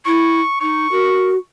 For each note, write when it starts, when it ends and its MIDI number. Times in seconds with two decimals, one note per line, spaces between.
0.06 0.40 64
0.06 0.57 85
0.61 0.87 63
0.61 1.41 85
0.92 1.37 66
0.92 1.30 70